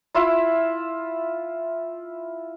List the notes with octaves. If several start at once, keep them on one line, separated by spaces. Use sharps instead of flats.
E4 F4 E5